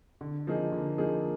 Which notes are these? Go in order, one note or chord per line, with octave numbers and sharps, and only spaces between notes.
D3
F3 A#3 D#4 G#4
D3
F3 A#3 D#4 G#4